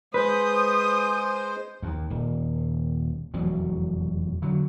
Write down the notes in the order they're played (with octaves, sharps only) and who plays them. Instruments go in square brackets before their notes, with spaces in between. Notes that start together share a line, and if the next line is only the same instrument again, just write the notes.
[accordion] G#3 C5 [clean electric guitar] B4 [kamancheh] D#6
[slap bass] D#2
D#1
F1 E2 B2 F#3
D3 F#3